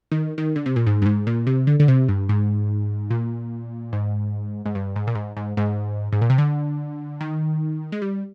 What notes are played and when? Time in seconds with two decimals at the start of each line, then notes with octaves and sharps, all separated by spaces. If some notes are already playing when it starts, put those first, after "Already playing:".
0.12 D#3
0.38 D#3
0.56 D3
0.66 C3
0.76 A#2
0.87 G#2
1.02 G2
1.06 G#2
1.27 A#2
1.47 C3
1.67 D3
1.80 D3
1.88 C3
2.08 G2
2.29 G#2
3.10 A#2
3.93 G#2
4.65 G#2
4.75 G2
4.96 G#2
5.07 A#2
5.15 G#2
5.37 G#2
5.57 G#2
6.12 G#2
6.22 A#2
6.30 C3
6.38 D3
7.21 D#3
7.92 G#3
8.02 G3